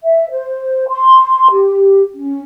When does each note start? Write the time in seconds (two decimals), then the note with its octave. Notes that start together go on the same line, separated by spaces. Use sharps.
0.04 E5
0.30 C5
0.89 C6
1.51 G4
2.15 C#4